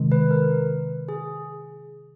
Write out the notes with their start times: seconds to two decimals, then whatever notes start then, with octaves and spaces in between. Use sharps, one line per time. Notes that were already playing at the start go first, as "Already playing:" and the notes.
Already playing: C3 D#3 G#3
0.12 B4
0.31 A#4
1.09 G#4